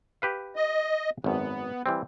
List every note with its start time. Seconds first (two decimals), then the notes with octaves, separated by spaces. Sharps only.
0.22 G4 B4 F5
0.56 D#5
1.24 G#1 F#2 B3
1.86 E3 G3 C4